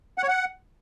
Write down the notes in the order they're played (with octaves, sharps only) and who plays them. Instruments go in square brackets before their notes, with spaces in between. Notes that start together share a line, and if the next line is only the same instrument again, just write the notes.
[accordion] F#5
C#5
F#5